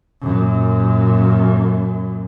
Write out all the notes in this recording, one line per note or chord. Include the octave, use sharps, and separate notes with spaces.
F#2 A#2